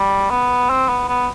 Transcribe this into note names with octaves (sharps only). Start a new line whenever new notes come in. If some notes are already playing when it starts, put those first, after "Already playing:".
Already playing: G3
B3
C4
B3
B3